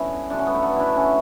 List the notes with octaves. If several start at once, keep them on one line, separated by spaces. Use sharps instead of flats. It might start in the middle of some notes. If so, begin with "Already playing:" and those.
Already playing: D3 G3 B3 C#4 E4
D3 F#3 A3 D4
C#4
B3
A3
B3
D4 E4
C#4